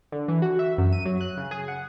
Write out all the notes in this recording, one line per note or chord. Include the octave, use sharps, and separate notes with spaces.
D3
E3
F#4
E5
F#2
D#7
F#3
F#6
C#3
G#4
F#5